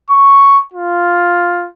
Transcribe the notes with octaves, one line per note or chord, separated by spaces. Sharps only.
C#6
F4